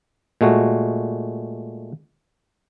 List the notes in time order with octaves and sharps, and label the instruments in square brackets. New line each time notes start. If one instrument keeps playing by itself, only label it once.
[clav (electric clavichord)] A#2 G#3 A3 F#4